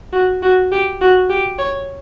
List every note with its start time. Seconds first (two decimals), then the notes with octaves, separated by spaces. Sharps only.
0.13 F#4
0.43 F#4
0.72 G4
1.01 F#4
1.30 G4
1.59 C#5